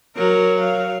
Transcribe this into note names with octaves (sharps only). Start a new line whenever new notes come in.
F#3 A#4
F5